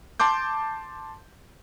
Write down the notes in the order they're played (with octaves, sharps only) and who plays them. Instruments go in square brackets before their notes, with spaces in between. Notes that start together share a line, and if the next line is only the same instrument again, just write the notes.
[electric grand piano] A5 C6 D6 G6